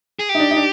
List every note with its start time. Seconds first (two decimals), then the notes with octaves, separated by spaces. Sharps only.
0.19 G#4
0.29 G4
0.35 D#4
0.40 D4
0.51 D#4
0.56 D4